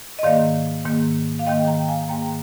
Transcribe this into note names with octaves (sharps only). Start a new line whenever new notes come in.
D#5
G#2 D#3 A#3 D5 F5
G#2 D#3 A#3
F5
G#2 D#3 A#3 D#5 G5
G5 A#5
F5 G#5
G#2 D#3 A#3 G5 A#5